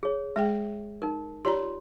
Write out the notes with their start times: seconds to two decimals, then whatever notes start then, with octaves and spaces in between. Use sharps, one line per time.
0.03 G#4 C#5
0.36 G#3 G#4 E5 G5
1.02 D#4 A#4
1.45 F4 G4 C#5 D5 A#5 C6